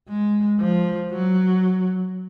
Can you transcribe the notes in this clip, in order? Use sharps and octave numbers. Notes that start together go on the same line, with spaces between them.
G#3
F3
F#3